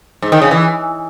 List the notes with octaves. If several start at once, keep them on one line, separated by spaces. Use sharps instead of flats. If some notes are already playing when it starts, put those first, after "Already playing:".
G#2
D#3
C#3
E3